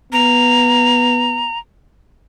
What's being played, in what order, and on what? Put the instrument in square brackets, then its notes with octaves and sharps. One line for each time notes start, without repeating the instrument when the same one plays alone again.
[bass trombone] B3 [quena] A#5